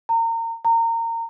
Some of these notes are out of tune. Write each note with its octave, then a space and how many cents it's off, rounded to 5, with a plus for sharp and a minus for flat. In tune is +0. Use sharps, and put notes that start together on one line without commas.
A#5 -30
A#5 -25